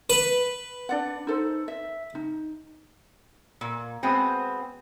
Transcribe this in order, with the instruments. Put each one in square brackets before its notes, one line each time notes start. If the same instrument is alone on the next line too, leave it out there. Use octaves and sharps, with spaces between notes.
[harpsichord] B4
[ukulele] D4 D5 F#5
D#4 A4 C5
E5
D#4
[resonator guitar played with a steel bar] A#2
G#3 B3 C4 F#4